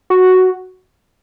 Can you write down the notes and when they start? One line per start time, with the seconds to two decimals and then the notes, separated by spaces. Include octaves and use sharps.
0.10 F#4